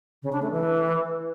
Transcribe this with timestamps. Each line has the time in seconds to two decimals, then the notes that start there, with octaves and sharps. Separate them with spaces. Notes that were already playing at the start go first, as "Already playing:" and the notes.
0.23 C#3
0.32 D4
0.42 A3
0.52 E3